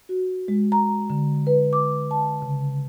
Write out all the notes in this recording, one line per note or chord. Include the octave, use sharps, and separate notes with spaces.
F#4
G#3
A#5
D3
B4
D6
A5
C#3